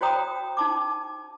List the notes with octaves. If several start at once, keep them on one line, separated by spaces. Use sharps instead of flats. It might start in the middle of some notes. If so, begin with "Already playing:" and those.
F#4 C5 C#5 G5 A#5 D#6
D#4 A5 D6